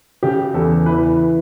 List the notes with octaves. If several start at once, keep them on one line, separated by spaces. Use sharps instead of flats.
C#3 G4
E2 A4
E3 B4